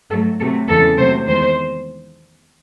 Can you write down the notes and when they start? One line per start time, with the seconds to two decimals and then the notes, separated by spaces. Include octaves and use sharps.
0.11 G#2 F#3 A3 A4
0.40 C3 F#3 A3 A4
0.69 E2 C#3 E3 G#3 A4
0.98 C3 F#3 A3 C5
1.28 E2 D#3 G#3 C5